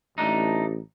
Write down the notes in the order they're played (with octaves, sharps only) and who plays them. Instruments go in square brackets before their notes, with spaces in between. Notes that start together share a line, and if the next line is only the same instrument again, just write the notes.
[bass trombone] A1 [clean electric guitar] A3 D4 D#4